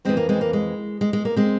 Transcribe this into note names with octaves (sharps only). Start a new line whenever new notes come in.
F2 E3 G#3 C4
A#3
G#3 C4
A#3
G#3
G#3
G#3
A#3
G#3 C4